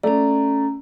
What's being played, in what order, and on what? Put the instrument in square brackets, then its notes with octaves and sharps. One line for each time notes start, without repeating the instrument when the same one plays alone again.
[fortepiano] A3 D5 [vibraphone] C#4 A#5